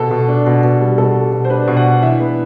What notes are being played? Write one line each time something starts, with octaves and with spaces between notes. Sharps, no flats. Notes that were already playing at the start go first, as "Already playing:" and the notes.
Already playing: B2 A4
B2
D4
B2
B2
G3
B2 A4
G3
B2
C5
D4 B4
B2
F#5
D4
E3 E5
B3